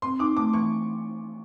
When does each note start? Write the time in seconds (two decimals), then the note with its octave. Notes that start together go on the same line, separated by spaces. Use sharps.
0.02 C4 C6
0.19 D#4 D6
0.36 A3 D6
0.53 E3 C#6